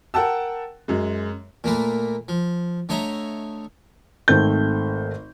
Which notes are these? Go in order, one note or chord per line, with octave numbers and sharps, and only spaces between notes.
A#4 F#5 G5 A5 E6
F#2 G#3
A#2 A3 A#3 B4
F3
D3 A3 C#5 D#5 E5 A#5
G#1 A3 C4 G6